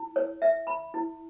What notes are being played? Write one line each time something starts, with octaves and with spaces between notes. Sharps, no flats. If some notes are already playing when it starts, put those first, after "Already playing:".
Already playing: E4
C#5
E5
B5
E4